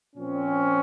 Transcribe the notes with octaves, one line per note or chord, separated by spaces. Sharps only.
A#2 F3 C4 C#4